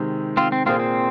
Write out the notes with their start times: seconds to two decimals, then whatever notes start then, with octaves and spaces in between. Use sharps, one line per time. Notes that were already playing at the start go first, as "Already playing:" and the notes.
Already playing: C3 D#3 G#3 C4
0.37 C4 F4
0.52 C4
0.65 A#2 A#3 C4 F4 G#4 C5
0.79 C4